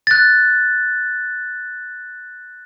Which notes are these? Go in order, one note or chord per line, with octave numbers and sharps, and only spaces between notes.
F#6 A6